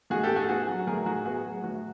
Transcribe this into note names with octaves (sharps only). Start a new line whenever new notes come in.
A2 F#4 G#4
G4 A4
A2
F#4 G#4
B3 F#4 G#4
F#3 F#4
A2 G#4 A#4
A2 F#4 G#4
B3 F#4 G#4
F#3
A2 F#4